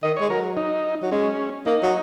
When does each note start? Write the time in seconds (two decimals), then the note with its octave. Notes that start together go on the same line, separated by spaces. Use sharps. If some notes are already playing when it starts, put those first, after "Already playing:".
0.03 D#3 D#5
0.17 G#3 C#5
0.30 F#3 A#4
0.57 D#4
1.02 F#3
1.11 G#3 C#4
1.66 A#3 D#4
1.82 F#3